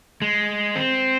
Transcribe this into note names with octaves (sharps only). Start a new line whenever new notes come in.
G#3
C4